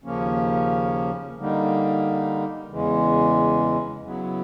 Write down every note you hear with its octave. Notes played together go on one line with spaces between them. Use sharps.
D#2 C#3 F3 A#3 C#4
D3 G3 A#3 D#4
E2 C#3 E3 G#3
C#3 F#3 B3 E4